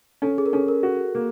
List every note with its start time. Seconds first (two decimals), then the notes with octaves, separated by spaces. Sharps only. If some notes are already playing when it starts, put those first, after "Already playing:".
0.22 C#4 A4
0.38 G#4
0.46 A#4
0.53 C#4 A4
0.68 A#4
0.83 F#4
1.15 A#3